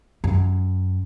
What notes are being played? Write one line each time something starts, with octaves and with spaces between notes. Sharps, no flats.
F#2